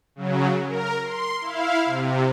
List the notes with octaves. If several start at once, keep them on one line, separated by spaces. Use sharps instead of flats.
C#3 F#3
A#4
C6
E4 F5
C3